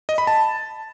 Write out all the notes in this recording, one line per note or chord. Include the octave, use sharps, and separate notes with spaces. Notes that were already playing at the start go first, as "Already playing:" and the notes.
D#5
B5
A5